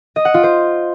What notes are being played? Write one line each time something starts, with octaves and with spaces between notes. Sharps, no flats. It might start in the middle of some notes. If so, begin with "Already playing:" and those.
D#5
F#5
F4
C5